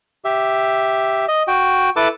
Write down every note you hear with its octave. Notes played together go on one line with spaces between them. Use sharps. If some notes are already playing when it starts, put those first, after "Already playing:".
G4 E5
D#5
F#4 G5
E4 A4 B4 A5 D6